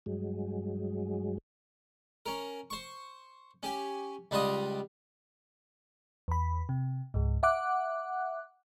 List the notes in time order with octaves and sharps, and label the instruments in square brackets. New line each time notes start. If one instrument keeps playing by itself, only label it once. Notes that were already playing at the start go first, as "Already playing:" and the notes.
[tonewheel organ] G2 F#3 G#3
[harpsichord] C#4 A#4
C5 C#6
C#4 G4 G#5
C#2 G3 D4 F4 D#5 D#6
[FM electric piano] E2 B5
C3
C#2 G#2
E5 F#5 D6 F#6